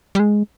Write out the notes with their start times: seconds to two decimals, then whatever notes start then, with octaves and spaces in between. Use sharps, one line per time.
0.15 G3
0.19 G#3